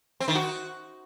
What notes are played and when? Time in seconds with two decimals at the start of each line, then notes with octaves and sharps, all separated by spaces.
0.20 C4
0.28 D#3
0.35 F#4